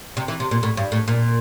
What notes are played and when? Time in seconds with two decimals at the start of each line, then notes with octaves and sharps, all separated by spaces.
0.17 C3
0.28 E3
0.40 C3
0.51 A#2
0.63 A2
0.77 G2
0.92 A2
1.08 A#2